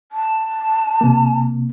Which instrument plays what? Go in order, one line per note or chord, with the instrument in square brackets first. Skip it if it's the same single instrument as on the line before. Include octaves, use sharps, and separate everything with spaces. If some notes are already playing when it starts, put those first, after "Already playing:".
[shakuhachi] A5
[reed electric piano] C3 A#3